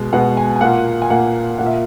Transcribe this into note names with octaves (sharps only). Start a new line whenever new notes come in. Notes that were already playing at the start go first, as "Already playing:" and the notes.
Already playing: B2 G#3
B2 G#3 B3 F#5
G#5
G#5
A#2 A#3 F#5
G#5
A#2 A#3 F#5
A#2 A#3 F#5
E5